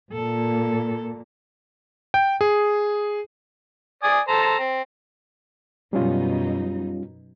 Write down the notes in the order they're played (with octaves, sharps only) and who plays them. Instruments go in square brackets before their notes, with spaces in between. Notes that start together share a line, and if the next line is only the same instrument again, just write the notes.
[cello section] A#2 [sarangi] A4
[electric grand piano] G5
G#4
[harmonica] D5 G#5 D#6
A4 C5 A#5
C4
[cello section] F#2 B2 D#4 [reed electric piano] G3 C#4 F4